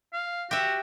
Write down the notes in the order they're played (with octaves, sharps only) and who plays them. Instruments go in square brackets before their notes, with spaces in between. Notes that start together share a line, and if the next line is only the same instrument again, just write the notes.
[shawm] F5
[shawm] F#4 [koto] G4 E5